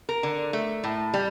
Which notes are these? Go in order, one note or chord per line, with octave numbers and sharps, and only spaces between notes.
A#4
D3
A3
A2
G3